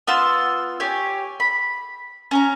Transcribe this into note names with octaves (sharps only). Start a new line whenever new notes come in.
B3 F4 C6 E6
G4 C#5 G#5
B5
C#4 G#5 A#5